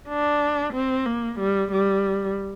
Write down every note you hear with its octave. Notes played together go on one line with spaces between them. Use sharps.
D4
C4
A#3
G3
G3